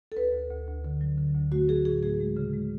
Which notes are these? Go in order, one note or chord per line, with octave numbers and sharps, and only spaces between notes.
A4
D2 B4
D2
D2
D2
D3
F#3
D3
D2
A3 F#4
F#3 G#4
A2 G#4
A3 G#4
G#3
C#3
G#3